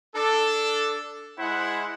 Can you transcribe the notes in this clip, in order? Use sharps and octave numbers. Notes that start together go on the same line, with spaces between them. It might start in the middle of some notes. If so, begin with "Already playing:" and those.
D4 A4
G#3 E4 C5 F#5